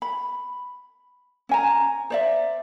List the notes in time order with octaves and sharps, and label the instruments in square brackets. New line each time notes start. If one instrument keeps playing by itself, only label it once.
[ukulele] B5
C#4 G#5 A#5
C5 D5 E5